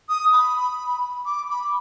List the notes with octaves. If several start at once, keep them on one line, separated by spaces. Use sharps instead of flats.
D#6
B5
D6
B5